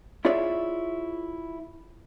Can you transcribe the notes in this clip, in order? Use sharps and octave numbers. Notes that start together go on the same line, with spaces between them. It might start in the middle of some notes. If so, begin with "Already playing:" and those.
E4 F4 G#4 C#5 D5 E5